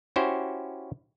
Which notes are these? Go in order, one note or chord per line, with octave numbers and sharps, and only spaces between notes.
C#4 E4 F#4 G4 C5